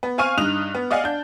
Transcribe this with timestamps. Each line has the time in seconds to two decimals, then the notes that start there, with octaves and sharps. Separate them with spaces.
0.03 B3
0.18 C4 F5 G#5 C#6 F6 D#7
0.38 G2 D#4 D#6 F#6 F7
0.75 B3
0.91 D5 D#5 F5 F#5 G#5
1.04 D4 G6